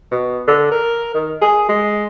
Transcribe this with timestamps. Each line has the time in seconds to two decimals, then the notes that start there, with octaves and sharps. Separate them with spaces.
0.12 B2
0.47 D3
0.71 A#4
1.14 D#3
1.41 G#4
1.69 G#3